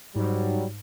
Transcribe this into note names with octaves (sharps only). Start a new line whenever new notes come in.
G#2 F#3 G3